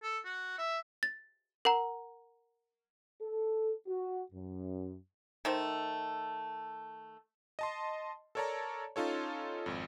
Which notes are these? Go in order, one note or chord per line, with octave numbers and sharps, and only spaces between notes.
A4
F#4
E5
A6
A#4 F#5 A#5
A4
F#4
F#2
D#3 A3 C5
D#5 A5 C6
A4 A#4 C#5 D5 A5 A#5
C#4 D#4 F4 A4 C#5
G#1 F2